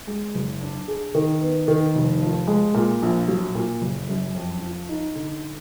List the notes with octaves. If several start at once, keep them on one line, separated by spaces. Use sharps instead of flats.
G#3
F#1
D4
G#4
D#3
B3
D#3
F1
F3
G#3
A#2
A#1
F#3
A#2
F#1
F#2
F2
F3
D#4
D3